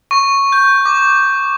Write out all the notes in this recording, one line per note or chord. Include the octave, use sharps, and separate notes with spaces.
C#6
G6
D6